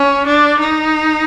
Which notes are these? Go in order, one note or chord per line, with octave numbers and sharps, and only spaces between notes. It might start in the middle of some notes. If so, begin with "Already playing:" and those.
Already playing: C#4
D4
D#4